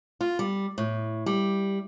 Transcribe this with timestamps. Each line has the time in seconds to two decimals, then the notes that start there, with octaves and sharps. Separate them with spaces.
0.21 F4
0.39 G3
0.78 A2
1.26 G3